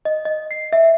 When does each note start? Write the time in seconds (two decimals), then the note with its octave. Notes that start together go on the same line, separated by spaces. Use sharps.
0.05 D#5
0.25 D#5
0.51 C7
0.73 E5